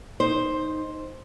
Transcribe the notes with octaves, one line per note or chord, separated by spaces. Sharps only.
D#4 C5